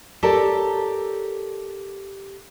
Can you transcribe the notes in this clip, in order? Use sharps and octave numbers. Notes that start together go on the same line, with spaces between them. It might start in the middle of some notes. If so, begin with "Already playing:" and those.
G4 A4 A#4 C#5 D5 A5